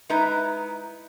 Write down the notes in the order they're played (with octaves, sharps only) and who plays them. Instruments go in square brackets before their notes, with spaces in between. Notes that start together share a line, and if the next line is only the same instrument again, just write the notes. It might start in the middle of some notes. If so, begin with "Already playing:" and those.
[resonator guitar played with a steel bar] G#3 D#4 E4 B4 A#5